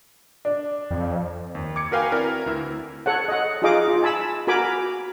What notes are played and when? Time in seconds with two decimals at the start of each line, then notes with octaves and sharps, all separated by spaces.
0.45 D4
0.91 F2
1.55 D#2
1.76 D6 G#6 C#7
1.91 F#4 A#4 B4 F5 G5 G#5
2.12 C4 E4 A#4 D5
2.46 D2 E4 E6
3.06 A4 C#5 F#5
3.28 D#5 F#5
3.62 D#4 F4 G#4 D#5 F5 D6
3.88 F4
4.03 G#5 A5 B5 E6
4.47 F#4 A#4 G#5 B5 D6